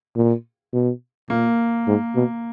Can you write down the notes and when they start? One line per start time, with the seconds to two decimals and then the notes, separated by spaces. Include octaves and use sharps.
0.16 A#2
0.73 B2
1.29 A#2 A#3
1.87 G#2
2.15 B2